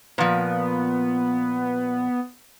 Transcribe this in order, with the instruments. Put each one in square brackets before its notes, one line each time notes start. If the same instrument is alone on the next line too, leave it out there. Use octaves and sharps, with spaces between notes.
[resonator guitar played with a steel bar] A#2 F3 [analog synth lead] B3